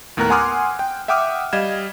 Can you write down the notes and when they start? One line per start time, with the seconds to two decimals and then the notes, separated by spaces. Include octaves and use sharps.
0.17 D#2 A2 B3 A#4 A#5 F#6
0.30 F#5 G#5 C6 D6 D#6 F6
0.79 G5
1.08 E5 F#5 G5 D6 D#6 F6
1.53 G3 D#5 F5 G#6 E7